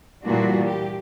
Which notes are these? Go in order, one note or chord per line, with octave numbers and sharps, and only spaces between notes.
A#2 E3 G3 D4 F#4
G4